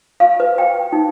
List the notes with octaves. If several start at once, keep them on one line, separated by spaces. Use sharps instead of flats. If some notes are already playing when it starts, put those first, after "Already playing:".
F5
B4
G5
D#4